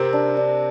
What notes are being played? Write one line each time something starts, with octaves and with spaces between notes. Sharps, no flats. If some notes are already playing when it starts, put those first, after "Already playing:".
Already playing: C3 C4 A#4
D4
D4